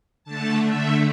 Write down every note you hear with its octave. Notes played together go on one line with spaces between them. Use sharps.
D3 A3 A5
E5